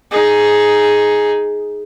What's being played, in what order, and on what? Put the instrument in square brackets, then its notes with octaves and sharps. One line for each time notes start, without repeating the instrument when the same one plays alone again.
[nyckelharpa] D#4 G#4